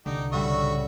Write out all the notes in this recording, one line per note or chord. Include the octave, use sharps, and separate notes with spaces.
C2 D3 D#4 G4
A2 C#3 G3 F#4 E5 C#6